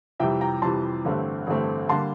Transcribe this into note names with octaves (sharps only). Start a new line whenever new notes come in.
F2 C3 E3 G3 E5 G5
G5 A#5
F2 C3 E3 G3 A5 C6
A1 G2 D3 A3 C4
A1 G2 D3 A3 C4
D3 G3 A#3 A5 C6